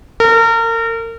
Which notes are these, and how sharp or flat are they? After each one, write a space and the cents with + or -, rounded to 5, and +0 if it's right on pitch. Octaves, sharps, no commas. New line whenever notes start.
A#4 -35